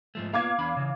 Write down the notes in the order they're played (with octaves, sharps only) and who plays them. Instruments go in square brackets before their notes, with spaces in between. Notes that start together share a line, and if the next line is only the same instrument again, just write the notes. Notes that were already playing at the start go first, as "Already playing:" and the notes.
[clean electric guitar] G#2 F3 A3
[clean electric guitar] A#3 B3 F4 [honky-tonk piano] F5 D6 G#6
[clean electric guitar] E2 D4 B5
C#3 E3